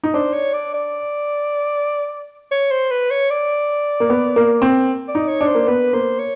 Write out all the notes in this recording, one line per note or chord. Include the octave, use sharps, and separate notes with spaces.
D#4
D4 C5
C#5
D5
D5
C#5
C5
B4
C#5
D5
A#3
B3
A#3
C4
D5
D#4
C#5
D4
C5
A#3
B3 B4
A#3 C5
C#5